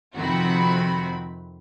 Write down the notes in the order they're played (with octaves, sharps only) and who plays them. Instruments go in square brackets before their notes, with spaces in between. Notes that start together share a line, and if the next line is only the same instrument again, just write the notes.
[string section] F2 C3 D#3 C4 F#4 B5